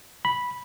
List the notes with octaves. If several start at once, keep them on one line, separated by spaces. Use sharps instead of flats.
B5